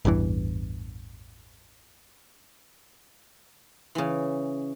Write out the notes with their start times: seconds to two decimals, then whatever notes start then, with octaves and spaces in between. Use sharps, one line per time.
0.05 A1 E2 G2 E3
3.95 C#3 E3